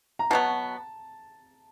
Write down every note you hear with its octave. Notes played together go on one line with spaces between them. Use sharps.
A#5
B2 F#3 B3 A5